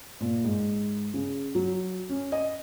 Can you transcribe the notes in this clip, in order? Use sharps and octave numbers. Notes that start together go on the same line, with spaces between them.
A#2
G#2
C#3
F#3
C#4
D#5